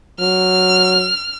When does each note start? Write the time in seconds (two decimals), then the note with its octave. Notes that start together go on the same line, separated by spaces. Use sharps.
0.20 F#3 F6